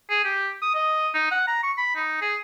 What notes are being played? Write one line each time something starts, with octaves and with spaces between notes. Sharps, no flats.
G#4
G4
D#6
D#5
D#4
F#5
A#5
C#6
B5
D#4
G#4